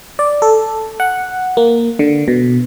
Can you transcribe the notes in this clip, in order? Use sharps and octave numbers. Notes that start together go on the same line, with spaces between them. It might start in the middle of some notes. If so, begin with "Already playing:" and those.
D5
A4
F#5
A#3
D3
B2